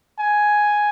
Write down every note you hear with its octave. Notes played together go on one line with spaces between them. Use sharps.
G#5